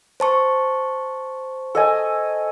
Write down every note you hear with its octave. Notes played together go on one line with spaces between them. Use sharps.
C5 A5 C#6
A4 D#5 G#5